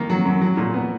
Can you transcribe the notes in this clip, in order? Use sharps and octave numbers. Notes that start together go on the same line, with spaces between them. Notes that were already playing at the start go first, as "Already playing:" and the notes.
Already playing: D#3 A#3
F#3
F#2
F#3
A#2
B3